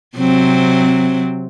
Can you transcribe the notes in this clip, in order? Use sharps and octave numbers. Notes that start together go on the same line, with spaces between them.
C3 F#3 C4